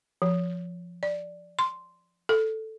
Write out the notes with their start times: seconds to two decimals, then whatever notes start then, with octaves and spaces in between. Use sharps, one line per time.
0.22 F3
1.03 D5
1.59 C6
2.29 A4